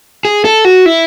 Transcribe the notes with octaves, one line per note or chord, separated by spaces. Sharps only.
G#4
A4
F#4
E4